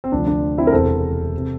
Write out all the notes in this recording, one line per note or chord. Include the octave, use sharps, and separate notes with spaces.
C4
D2 C3 F3 D4
D4
C4 E4
A#4
E1 E2 C3 A4 C5
C3